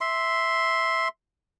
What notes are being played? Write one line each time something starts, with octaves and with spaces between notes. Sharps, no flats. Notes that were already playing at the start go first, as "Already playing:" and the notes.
E5 C6